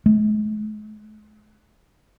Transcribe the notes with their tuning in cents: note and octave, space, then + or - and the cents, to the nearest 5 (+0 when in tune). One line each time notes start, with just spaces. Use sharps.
G#3 +45